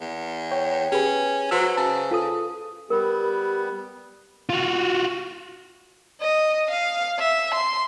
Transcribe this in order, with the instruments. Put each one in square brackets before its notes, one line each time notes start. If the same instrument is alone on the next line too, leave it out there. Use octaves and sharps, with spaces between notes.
[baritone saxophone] E2
[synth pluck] C#5 G5
[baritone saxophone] C#4 [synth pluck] G4 G#4 B4
[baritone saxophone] F#3 [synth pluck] B4 C5 E6
[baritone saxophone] C#3 [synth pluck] A5
[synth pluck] F4 A4 D#6
[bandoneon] G3 B3 [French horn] G4 [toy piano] A#4
[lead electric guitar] F4 F#4
[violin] D#5
F5
E5
C6